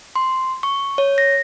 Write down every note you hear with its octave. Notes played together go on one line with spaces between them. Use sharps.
C6
C#6
C#5
A#6